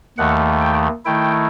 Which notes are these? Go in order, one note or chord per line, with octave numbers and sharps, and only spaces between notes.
D#2 D#3 A3 F#5
G5
D#3 A3 E4 G5